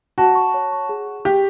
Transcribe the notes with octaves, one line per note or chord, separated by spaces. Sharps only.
F#4 A5
C#6
C#5
C#6
G#4
G#4
G4 G#4